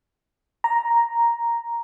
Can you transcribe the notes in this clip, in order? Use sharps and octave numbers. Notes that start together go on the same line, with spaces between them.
A#5